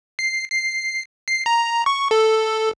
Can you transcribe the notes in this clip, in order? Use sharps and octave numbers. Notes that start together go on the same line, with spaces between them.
C7
C7
C7
A#5
C#6
A4